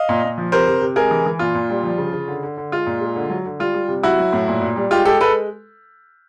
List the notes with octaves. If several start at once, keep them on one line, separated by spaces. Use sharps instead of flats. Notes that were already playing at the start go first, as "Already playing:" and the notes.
Already playing: D#5 F5
A#2
A#2
F3
C3 A#4 C5
C3
C3
G#3 G#4 A#4
E3
E3
A#2 F4
A#2
G3
F3
C#3
C#3
D3
D3
D3
G#3 F4
A#2
G#3
D3
F#3
D3
G3 F4
G3
C3
F#3 E4 F#4
F#3
A2
A#2
A#2
G3
G#3 F4 G4
G#3 G4 A4
G#3 A4 B4